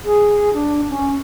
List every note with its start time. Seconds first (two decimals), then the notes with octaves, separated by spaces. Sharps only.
0.05 G#4
0.54 D4
0.90 C#4